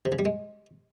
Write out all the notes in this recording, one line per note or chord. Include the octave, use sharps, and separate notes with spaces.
C3
C#3
G3
G#3